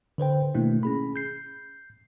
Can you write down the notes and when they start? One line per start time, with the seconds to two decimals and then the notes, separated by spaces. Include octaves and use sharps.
0.18 D3 B4 C5 G5
0.55 B2 D#3 A3 A#3 D4 E4
0.83 C#4 G#4 B5
1.16 G6 C7